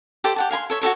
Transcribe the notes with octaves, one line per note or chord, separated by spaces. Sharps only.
G4 A4 C5 D5
G4 F#5 A5
F5 G#5 B5 C6
A4 C#5 E5
F#4 G4 A4 C#5